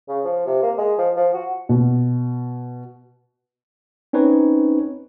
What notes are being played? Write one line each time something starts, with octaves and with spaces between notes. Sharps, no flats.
C#3
F3
C3
A#3
G#3
F3
F3
F#4
B2
C4 C#4 D#4 B4 C#5